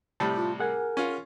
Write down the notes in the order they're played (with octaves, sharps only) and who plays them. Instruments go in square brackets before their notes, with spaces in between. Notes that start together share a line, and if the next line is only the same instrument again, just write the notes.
[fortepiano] A2 C3 G3 [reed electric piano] A5
[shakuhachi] F4
[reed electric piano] G#4 F#5 G#5 [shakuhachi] A#4
[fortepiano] C#4 F4